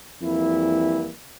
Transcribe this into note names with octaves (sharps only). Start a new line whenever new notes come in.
F2 E3 G3 A#3 E4